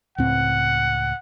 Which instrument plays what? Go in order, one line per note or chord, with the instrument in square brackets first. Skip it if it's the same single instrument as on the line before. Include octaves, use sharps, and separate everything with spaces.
[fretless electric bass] C#2 A2 C4 [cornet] F#5